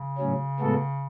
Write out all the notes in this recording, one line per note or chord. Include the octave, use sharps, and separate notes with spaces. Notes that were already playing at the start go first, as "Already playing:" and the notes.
Already playing: C#3
A2 F#3 C#4
A2 G#3 B3 F#4 A4